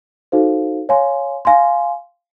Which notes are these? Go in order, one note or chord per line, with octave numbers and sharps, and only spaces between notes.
D#4 F#4 A4 C5 F5
C#5 F5 G#5 C6
F5 G#5 C6